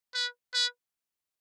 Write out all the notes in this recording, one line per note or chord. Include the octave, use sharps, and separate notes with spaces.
B4
B4